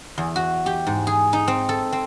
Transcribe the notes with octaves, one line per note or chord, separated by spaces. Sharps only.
E2
F#4
G4
G#2
G#4
D#4
C4
A4
C4